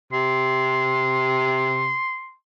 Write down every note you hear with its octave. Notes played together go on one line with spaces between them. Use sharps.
C3 C6